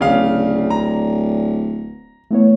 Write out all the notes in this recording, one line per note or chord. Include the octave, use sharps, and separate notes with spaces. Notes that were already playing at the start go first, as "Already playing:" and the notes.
D1 C#3 D5 F5
A#5
E3 A3 B3 C#5